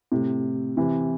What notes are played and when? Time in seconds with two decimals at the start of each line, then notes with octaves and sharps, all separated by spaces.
0.12 A2 C3
0.77 C3 E3